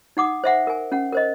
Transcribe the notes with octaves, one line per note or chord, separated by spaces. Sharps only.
D#4 F#5 D6 D#6
C5 E5 F#5
A#4 G#5
C#4 F#5
A#4 C5 D#5